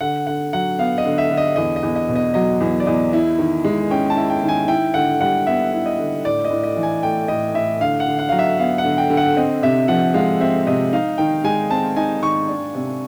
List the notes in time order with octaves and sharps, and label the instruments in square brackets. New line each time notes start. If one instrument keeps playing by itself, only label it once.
[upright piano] D3 [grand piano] F#5
[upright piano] D3 [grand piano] F#5
[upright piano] F#3 [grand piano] F#5
[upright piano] B3 [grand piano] F5
[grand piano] D#5
[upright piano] D3
[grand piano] E5
[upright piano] D3
[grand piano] D#5
[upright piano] E2 [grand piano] D#5
[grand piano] D#5
[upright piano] E2
[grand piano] D#5
[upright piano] B2
[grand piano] D#5
[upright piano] F#3 [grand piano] D#5
[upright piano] E2
[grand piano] D5
[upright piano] E2 [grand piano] D#5
[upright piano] E4
D#3
G#3
[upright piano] C#4 [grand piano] G5
[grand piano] A5
[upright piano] E4
[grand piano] G5
[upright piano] D#3
[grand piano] G#5
[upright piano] E4 [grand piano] G5
[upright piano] D3 [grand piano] F#5
[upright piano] G3 [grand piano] F#5
[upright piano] B3 [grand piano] E5
[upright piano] E4
[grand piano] D#5
[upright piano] D3
[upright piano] A2 [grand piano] D5
[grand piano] D#5
[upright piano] A2
[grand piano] D#5
[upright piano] E3
[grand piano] G#5
[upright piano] A3 [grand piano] G5
[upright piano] A2 [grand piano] D#5
[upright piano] A2 [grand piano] E5
[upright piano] D3 [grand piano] F5
[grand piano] F#5
[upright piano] D3
[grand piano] F#5
[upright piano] F#3 [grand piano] F5
[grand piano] E5
[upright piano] B3 [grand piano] F5
[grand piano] F#5
[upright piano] D3
[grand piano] G5
[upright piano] D3
[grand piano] F#5
[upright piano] C4 [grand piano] D#5
[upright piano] C3 [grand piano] E5
[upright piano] F3 [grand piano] F#5
[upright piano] G#3 [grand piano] F5
[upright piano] C4 [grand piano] E5
[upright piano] C3 [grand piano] D#5
[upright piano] D#4 [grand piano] F5
[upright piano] D#3 [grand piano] G5
[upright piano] G#3 [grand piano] G#5
[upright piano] C4 [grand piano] A5
[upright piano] D#4 [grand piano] G#5
[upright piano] D#3 [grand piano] C#6
[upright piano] D4
C3